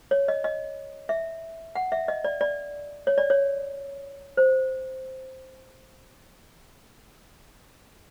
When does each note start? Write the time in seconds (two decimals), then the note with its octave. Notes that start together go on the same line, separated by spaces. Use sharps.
0.11 C#5
0.28 D#5
0.44 D#5
1.09 E5
1.75 F#5
1.92 E5
2.08 D#5
2.24 D5
2.41 D5
3.07 C#5
3.18 D5
3.30 C#5
4.37 C5